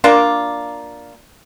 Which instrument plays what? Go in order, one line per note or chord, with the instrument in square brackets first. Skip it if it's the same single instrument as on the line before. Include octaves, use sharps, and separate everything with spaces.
[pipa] A#3 D4 F4